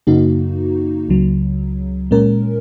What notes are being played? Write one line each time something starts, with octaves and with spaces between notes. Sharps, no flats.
F#2 C#3 A#3 D#4 F#4
C#2 C#3 F#3
A#2 G#3 C#4 A#4